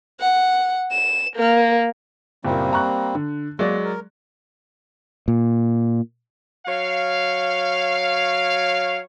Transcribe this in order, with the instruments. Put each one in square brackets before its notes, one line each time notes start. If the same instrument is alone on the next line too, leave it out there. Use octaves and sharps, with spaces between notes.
[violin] F#5
E7
A#3
[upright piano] F#1 A#2 [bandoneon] G3 A#3 C4
[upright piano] A#5 C#6 F#6
D3
[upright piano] F#3 G#3 D5 [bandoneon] A#3
[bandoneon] A#4
[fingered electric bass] A#2
[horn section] F#3 C#5 F5